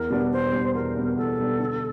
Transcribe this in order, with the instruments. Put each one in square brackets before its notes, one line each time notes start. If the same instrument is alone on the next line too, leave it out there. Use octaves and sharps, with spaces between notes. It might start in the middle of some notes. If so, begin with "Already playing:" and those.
Already playing: [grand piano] E2 [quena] A#4
[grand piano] B2 G3 B3 D4
[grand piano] E2 [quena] C5
[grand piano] B2 G3 B3 D4
[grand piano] E2 [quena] A#4
[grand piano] B2 G3 B3 D4
[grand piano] E2 [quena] A4
[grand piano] B2 G3 B3 D4
D3